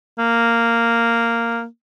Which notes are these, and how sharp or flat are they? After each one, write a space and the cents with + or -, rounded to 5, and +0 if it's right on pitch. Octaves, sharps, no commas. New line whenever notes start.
A#3 -10